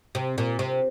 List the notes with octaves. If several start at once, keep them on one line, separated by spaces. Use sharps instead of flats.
C3
A#2
C3